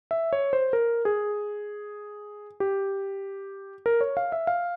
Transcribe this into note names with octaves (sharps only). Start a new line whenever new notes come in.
E5
C#5
C5
A#4
G#4
G4
A#4
C#5
F5
E5
F5